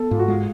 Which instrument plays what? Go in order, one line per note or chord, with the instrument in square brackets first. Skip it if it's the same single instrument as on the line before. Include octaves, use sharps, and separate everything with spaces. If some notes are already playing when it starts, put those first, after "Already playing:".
Already playing: [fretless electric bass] B3 [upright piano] A4
[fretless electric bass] G#2 [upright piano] F4
[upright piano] F#4
[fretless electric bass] G#3 [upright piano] F4